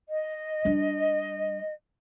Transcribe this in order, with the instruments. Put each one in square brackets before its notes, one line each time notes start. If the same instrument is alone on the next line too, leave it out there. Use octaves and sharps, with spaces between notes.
[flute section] D#5
[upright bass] G3 D4